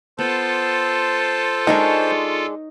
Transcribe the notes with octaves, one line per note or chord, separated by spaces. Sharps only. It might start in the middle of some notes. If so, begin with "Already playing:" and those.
B3 F4 A4 C5 A5
G#3 D4 D#4 A#4 C#5